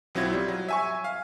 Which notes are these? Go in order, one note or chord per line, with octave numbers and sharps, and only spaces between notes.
B1 F#3 C4 E4 F4 G#6
G3
F#3
E5 G#5 C#6
F5